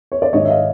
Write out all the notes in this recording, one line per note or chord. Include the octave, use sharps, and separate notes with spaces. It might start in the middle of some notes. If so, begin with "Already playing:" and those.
C#5
D5
G#2 D#3 G#3 C#5 D#5
E5
D#5 F5